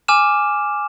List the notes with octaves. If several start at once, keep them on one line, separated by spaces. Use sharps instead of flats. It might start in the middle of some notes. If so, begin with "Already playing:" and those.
G#5 D6 F6 E7